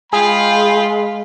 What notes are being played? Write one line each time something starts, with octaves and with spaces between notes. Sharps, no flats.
G#3 F4 G#4 F5 G5 B5